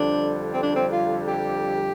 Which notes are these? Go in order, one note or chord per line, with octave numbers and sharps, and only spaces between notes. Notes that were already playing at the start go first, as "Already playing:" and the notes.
Already playing: F2 D3 G3 D4
C4
D4
C4
F4
G4